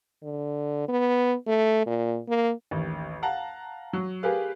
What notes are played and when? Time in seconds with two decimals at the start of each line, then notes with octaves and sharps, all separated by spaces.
0.22 D3
0.88 B3
1.47 A3
1.87 A#2
2.29 A#3
2.71 A1 D#2
3.23 F5 F#5 A5 A#5
3.93 F#3
4.23 G4 G#4 A#4 B4 F5